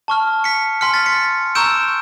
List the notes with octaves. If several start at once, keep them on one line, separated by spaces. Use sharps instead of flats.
A5 C#6 F6
B6 C#7
G#5 C6 F6 B6 C#7
A6 B6
B6 C#7
A#5 C#6 E6 G6 D7 E7